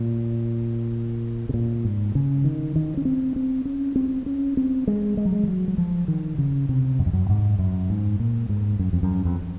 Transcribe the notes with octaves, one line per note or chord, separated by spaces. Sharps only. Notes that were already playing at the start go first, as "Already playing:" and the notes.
Already playing: A#2
C3
A#2
G#2
C#3
D#3
D#3
C#4
C4
C4
C#4
C4
C#4
C4
G#3
G#3
F#3
G#3
F3
F#3
F#3
F3
D#3
C#3
C3
F#2
F2
F#2
G#2
F#2
G#2
A#2
G#2
F#2
F2
F#2
F2